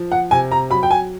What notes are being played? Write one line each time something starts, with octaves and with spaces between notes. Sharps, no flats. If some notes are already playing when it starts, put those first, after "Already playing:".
Already playing: F3
F#5
C3 G#5
A#5
F#3 B5
G5
G#5